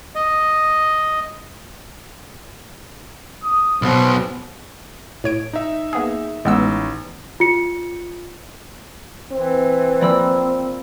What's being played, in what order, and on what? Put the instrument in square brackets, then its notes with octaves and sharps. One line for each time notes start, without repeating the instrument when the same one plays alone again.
[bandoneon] D#5
[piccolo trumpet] D#6
[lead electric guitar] B1 B2 [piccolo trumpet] C5
[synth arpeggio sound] A2 C#5 D7
[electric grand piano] D#4 E5
[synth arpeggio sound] A#3 B3 G#4
[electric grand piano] A1 D#4 [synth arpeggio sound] G#3 B3 E6
[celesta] F4 C#7
[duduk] E3 [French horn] C4
[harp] F3 A#3 A#4 [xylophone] D5 B5 E6